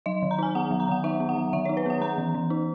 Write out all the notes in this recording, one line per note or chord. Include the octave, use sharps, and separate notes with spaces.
F#3 D#5
D#3
A#5
D#4 G#5
B3 F#5
F#3
A#5
D#3 F#5
D#4 E5
B3
F#5
F#3
D#3 E5
C#5
D#4
B4
B3 F#5
B3 A#5
E3
E3
D#4